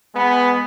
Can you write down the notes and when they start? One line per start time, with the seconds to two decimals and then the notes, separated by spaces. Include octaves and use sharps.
0.15 G#3 B3